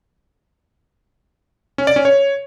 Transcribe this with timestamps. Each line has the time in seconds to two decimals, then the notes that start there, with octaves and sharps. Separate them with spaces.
1.78 C#4
1.87 D5
1.96 C#4
2.05 C#5